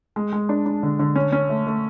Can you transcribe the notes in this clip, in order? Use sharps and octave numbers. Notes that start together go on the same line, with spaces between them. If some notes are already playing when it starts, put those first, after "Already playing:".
G#3
G#3
D4
D4
D3
D3
C#4
C#4
A3
A3